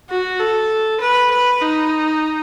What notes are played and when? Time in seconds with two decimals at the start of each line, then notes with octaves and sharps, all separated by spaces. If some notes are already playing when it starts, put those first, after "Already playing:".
0.10 F#4
0.39 A4
1.00 B4
1.31 B4
1.61 D#4